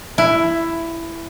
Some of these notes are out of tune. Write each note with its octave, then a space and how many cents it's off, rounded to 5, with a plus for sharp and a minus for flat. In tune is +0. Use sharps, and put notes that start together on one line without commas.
E4 +10